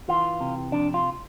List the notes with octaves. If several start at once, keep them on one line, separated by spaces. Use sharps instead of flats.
E3 F4
C3
F2 D4
F4